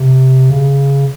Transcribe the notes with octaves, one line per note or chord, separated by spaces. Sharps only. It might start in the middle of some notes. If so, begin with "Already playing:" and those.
Already playing: C3
C#3